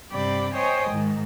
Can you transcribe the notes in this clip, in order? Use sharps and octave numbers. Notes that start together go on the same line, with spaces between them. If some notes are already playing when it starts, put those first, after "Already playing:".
G2 C3 D5 G5 B5
C5 C#5 D#5 G5 G#5
G#2 D#3